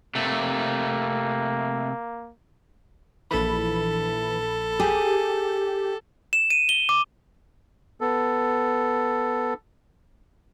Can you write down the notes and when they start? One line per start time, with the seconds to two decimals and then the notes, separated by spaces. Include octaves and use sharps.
0.15 C3 A3 A#3
3.31 A#1 E3 A4 B5
4.80 G4 G#4
6.33 E7
6.50 D#7
6.69 G7
6.89 D6
8.01 B3 A4